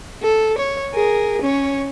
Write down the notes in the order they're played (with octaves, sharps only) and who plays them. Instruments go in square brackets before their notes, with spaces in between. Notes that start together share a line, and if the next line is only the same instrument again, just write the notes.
[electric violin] A4
C#5
G#4 A#4
C#4 C#5